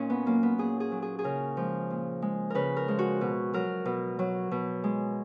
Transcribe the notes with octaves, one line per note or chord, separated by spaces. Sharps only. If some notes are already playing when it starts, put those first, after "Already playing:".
Already playing: A#2 C#4 D#4
B3
F#3 A#3
B3
A#2 G#4
G#4
F#3
G#4
G#4
C#3 A#4
F3 G#3
A#2
G#3
C#3 A#4 B4
A#4
F3 G#3
F#4
B2
F#3 A#4
B2
F#3
B2
G#3